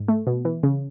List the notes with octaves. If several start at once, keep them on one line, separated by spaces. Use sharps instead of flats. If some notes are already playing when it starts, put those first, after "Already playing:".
Already playing: G#2
A3
B2
E3
C#3